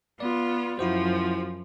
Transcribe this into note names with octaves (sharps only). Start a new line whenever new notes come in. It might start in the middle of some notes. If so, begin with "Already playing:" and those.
B3 F4 D5
F#2 F3 E4 F#4 C5